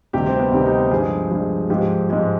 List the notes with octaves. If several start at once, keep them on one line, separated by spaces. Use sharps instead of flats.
D2 C3 D#3 G3 G4
C4
B3
D2 C3 D#3 G3 C4
D#4
G2 F3 G#3 G#4
G2 F3 G#3
G#2 F3 G#3 G4
G#2 F3 G#3